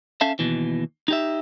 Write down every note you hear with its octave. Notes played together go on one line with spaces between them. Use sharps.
C#4 A4 E5 F5 A5
D#2 B2 E3
D#4 G4 E5